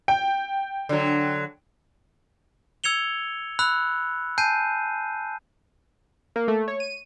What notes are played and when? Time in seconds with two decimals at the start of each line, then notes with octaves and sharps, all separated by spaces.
0.08 G5
0.89 D3 F#3
2.84 E6 G#6 C#7 F7 G7
3.59 B5 E6 F#6
4.38 G#5 A5 G6 C7 D#7
6.36 A#3
6.48 A3
6.68 C#5
6.80 D#7